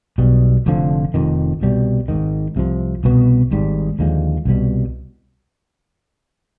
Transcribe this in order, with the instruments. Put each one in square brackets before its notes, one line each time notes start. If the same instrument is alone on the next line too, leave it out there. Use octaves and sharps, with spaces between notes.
[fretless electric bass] B1 B2 G3
F1 F2 D3 F3
F1 F2 D#3
C2 B2 G3
G#1 G#2 D#3
C2 C3 F3
C2 B2 B3
G#1 G#2 G3
D#2 D3 F3 G#3
C2 B2 G3